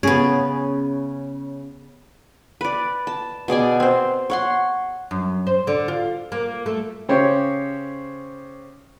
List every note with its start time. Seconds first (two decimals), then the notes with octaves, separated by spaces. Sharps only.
0.03 C#3 B3 C#4 G#4
2.61 B4 D5
3.07 A5
3.48 B2 G#4 D5 G#5
3.80 C4 C5
4.30 C#5 F#5 C6
5.11 F#2
5.47 C5
5.67 D3
5.88 F4
6.32 A#3
6.66 A3
7.09 C#3 G4 C5 C#5